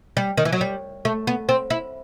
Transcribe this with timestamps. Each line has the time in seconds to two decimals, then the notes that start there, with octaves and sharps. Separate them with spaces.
0.17 G3
0.37 D#3
0.45 E3
0.52 F#3
0.61 G3
1.05 A3
1.27 B3
1.49 C4
1.70 E4